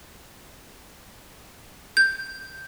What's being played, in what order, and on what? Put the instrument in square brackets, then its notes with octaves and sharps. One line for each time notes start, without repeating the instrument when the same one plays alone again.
[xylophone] G6